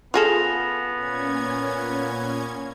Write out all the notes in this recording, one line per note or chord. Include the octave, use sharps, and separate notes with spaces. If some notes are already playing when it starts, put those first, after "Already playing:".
B3 F4 G#4 A4 F6 A#6 F7
A#2 C#4 G#6